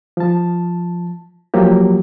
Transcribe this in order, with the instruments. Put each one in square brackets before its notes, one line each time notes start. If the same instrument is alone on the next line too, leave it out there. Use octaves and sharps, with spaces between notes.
[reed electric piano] F3 A5
F3 F#3 A#3 G4